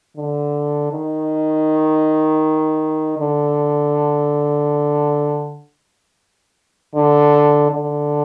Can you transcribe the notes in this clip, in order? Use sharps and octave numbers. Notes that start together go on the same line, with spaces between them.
D3
D#3
D3
D3
D3